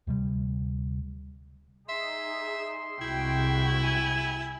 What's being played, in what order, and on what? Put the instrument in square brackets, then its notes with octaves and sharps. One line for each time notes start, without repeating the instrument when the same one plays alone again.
[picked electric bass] D2 C3 G3
[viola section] D#4 G#4 [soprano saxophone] E5 [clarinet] C6
[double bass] C2 C3 [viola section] G#3 F#4 G5 [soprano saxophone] E4
[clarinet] G#5